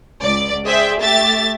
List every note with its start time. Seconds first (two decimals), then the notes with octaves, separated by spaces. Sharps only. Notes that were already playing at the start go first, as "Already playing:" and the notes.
0.22 C#2 D5
0.65 G#4 C5 D5 E5 G5
1.01 A3 G4 E5 A6